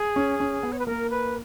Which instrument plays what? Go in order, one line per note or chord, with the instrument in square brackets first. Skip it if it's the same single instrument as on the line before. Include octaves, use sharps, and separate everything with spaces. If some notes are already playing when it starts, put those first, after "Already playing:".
Already playing: [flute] G#4
[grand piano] C#4
C#4
B3
[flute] C#5
B4
[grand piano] A#3 [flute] A#4
[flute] B4